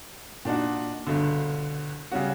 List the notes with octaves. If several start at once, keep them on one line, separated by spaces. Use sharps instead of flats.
A#2 D4 D#4 F#4
G1 C#2 B2 D3
C#3 G3 C#4 F#4